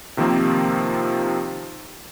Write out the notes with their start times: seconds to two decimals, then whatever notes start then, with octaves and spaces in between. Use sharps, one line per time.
0.17 C3 D#3 F3 A#3 C4